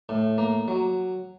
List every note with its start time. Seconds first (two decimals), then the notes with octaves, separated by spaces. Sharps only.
0.09 A2
0.38 A#3
0.68 F#3